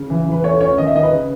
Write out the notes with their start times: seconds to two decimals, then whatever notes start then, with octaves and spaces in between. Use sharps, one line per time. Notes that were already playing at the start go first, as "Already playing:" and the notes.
Already playing: C#3
0.10 E3
0.26 E3
0.32 B4
0.44 A3 C#5
0.61 C#4 C#5
0.78 D#3 D#5
0.87 E5
0.95 D#3 D#5
1.03 B4
1.12 C#3